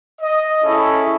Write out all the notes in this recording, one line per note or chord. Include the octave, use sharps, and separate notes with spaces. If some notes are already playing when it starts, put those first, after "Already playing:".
D#5
C#4 E4 G#4 A4